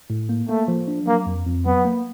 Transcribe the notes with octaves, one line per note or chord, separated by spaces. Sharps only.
A2
A#3
A3 A#3
F3
D4
F#3 A#3
F2
F2
F#3 B3
A#3